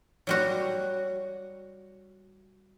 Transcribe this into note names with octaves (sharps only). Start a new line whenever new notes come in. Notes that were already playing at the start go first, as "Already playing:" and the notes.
F#3 G3 F#4